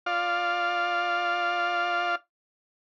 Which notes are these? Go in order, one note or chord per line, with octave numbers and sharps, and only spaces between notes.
F4 D5 F5